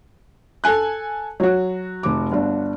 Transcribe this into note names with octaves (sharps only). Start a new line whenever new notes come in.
A4 G#5 F#6
F#3 F#4 C#5
F1 D6
G1 D4